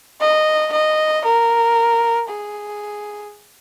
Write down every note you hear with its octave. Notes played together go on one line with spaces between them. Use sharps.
D#5
D#5
A#4
G#4